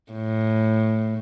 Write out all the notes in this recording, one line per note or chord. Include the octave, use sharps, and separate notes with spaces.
A2